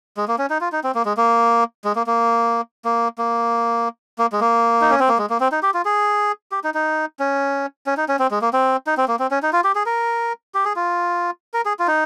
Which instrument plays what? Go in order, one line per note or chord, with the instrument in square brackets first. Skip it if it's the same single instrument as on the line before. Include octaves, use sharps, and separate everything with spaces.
[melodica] G#3
A#3
C#4
D#4
F4
D#4
C4
A#3
G#3
A#3
G#3
A#3
A#3
A#3
A#3
A#3
G#3
A#3
D#4
C#4
C4
A#3
G#3
A#3
C4
D#4
G4
F4
G#4
G4
D#4
D#4
C#4
C#4
D#4
C#4
C4
G#3
A#3
C4
D#4
C4
A#3
C4
C#4
D#4
F4
G4
G#4
A#4
G4
G#4
F4
A#4
G#4
F4
D#4